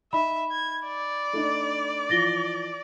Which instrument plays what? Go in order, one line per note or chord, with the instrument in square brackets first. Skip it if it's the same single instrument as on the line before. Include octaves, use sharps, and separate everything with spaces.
[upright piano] D#4 [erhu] E5 [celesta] B5
[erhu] G#6
D5
[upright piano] A3 D4 D#4
[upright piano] E3 F3 F4 [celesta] A6 A#6 G7